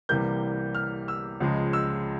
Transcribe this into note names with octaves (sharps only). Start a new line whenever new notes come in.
C2 C3 E3 G3 A#3 G6
F6
E6
C#2 C#3 F3 G#3
E6